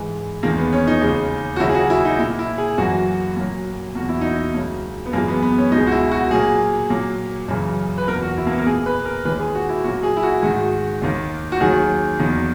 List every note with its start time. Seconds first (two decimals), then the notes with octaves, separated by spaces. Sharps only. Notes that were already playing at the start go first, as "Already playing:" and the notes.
Already playing: G#2 E3 G#3
0.43 E2 D#3 G#3 A#3
0.58 B3
0.73 C#4
0.87 D#4
1.01 D#2 C#3 G#3
1.56 F#4
1.60 D#2 C#3 F#3 A#3 E4
1.69 G#4
1.75 F#4
1.90 E4
2.05 D#4
2.19 A#2 A#3 E4
2.39 E4
2.58 G#4
2.78 F#2 E3 A#3 F#4
3.36 A#2 F#3 A#3
3.95 E2 B2 A#3 F#4
4.09 E4
4.21 D#4
4.33 E4
4.54 C#2 C#3 F#3 A#3
5.06 B3
5.13 F#2 E3 G#3 A#3
5.28 B3
5.43 B3
5.58 C#4
5.72 C#2 B2 G#3 D#4
5.87 F#4
5.91 E4
6.11 F#4
6.31 A#2 F#3 A#3 G#4
6.90 A#2 F#3 A#3
7.48 F#2 C#3 E3
7.98 B4
8.08 E2 B2 A#3 A#4
8.22 F#4
8.37 E4
8.47 A#3
8.51 B3
8.59 A#4
8.66 A#2 A#3 G#4
8.86 B4
9.05 A#4
9.25 D#2 D#3 G#3 B4
9.40 G#4
9.55 F#4
9.69 E4
9.84 A#2 F#3 A#3 F#4
10.03 G#4
10.17 E4
10.23 F#4
10.42 G#2 D#3 G#3 F#4
11.02 D#2 D#3 A#3
11.52 F#4
11.60 D#2 D#3 F#3 G#4
12.19 E2 D#3 F#3 A#3